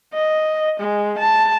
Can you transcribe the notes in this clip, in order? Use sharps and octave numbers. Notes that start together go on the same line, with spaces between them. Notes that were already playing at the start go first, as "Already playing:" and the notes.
D#5
G#3
A5